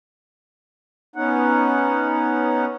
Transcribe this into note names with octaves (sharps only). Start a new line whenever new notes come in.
B3 C#4 D#4 F#5